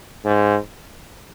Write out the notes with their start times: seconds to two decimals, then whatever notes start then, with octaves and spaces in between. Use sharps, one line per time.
0.25 G#2